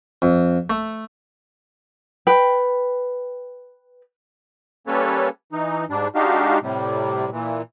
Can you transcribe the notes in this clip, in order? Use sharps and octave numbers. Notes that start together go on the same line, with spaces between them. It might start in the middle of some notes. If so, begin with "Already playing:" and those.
F2
A3
B4 G5
G3 A#3 C#4 A4 B4 C#5
E3 D#4
G#2 G3 D4
G#3 D4 D#4 F#4 G4 F5
A2 C3 G3
A#2 E3